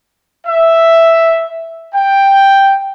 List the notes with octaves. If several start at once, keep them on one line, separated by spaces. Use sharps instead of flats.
E5
G5